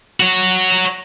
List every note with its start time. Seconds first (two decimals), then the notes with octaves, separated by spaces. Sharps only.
0.20 F#4 C#5